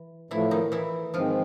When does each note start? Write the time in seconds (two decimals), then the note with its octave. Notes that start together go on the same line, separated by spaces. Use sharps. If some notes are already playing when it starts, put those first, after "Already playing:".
Already playing: E3
0.30 A2 E3 F3 A3 E4
0.51 D#3 D#4
0.72 E3 E4
1.13 G#2 D#3 F3 G#3 C4 F4